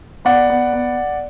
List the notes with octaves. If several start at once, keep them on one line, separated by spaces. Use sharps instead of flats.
B3 D5 F#5
B3
B3